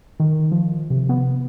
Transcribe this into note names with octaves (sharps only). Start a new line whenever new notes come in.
D#3
F3
C3
B3